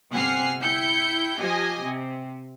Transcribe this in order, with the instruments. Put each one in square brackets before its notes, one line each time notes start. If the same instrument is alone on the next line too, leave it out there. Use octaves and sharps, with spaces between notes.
[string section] G1 C3 F#5 G#5 F6 C7
E4 G5 G6 C#7
F3 G4 D#5 G#5
C3